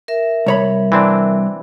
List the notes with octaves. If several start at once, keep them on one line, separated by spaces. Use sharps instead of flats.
A#4 E5
C2 C#5 B5
E3 C4 D4